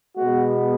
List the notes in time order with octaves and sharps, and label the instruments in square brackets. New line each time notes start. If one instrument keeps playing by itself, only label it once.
[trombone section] B2 G#3 B3 F#4